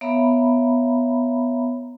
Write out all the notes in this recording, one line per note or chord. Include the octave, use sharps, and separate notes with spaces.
B3 C#5 E5 F5 A#5 B5